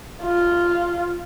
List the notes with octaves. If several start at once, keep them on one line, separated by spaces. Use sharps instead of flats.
F4